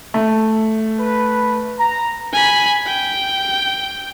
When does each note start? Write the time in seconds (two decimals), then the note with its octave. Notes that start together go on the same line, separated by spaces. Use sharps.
0.14 A3
1.00 B4
1.79 A#5
2.33 G#5 B5
2.87 G5